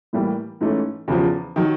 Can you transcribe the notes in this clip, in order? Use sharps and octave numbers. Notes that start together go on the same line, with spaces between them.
A2 E3 G3 A#3
G#2 E3 A3 C#4
E2 C#3 F3
D#3 F#3